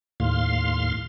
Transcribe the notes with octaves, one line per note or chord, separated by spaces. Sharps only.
D#2 A2 F5 C6